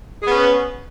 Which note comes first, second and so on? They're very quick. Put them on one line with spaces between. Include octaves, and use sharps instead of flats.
G#4 B3 C#4 B4